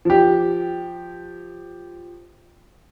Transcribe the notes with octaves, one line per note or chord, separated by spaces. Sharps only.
F3 G4